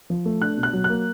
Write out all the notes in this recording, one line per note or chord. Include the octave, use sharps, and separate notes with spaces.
F3
A3
D4 F#6
B2
F#6
F#3
F#6
A#3